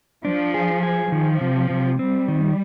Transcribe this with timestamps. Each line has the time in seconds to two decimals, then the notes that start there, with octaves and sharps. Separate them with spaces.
0.25 F3 D4
0.54 G#4
0.83 G#4
1.12 D#3 F3
1.41 C3
1.70 C3
1.99 G3 C4
2.28 D#3